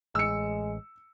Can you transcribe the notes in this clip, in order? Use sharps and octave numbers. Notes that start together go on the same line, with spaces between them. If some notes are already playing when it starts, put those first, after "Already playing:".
A1 G#3 E6 C#7